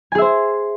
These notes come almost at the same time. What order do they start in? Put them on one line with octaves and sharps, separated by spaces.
G#5 G#4 E5 C5